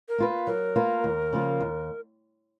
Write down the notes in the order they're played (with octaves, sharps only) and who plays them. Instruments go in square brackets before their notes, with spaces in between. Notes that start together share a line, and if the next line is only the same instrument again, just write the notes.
[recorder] A#4
[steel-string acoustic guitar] A#3 F4 B4
[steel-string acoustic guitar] F#3 [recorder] A#4
[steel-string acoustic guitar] A#3 F4 B4
D#2
C#3 F3 A#3 F4
D#2